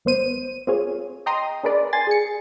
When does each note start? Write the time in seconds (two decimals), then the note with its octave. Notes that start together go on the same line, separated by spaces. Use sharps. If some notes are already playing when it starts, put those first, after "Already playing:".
0.05 G#1 B3 C5 D#7
0.67 C4 F4 G#4 C#5
1.26 D#5 G5 A#5 C6 D#6
1.63 D4 G#4 A#4 B4 D5
1.93 G#5 C6 A6
2.07 G#4 C#7